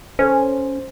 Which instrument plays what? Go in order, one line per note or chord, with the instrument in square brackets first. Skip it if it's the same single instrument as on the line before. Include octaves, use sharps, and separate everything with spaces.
[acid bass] C#4 [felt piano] A4 C5